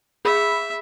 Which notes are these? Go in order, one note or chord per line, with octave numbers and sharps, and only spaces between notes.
G#4 E5 B5